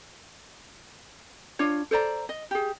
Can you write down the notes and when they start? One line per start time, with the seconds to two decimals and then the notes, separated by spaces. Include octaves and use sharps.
1.59 D4 F4 C#5
1.91 A4 C5 D5 A#5
2.29 D#5
2.51 G4 G#4